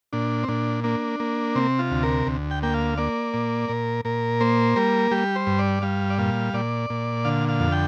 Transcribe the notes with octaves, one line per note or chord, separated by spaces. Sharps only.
A#2 D4
C4
A#2 D4
A#3 D4
A#3
C3 C4
F4
D2
A#4
D2
G5
A#3 G5
F5
A#3 D5
A#2
A#2 A#4
A#2 A#4
A#3 C5
G3 A#4
G3 G4
C5
G2
D5
G3 F5
D5
A#2 F5
A#2 D5
A#2
D3 F5
F5
F2
G5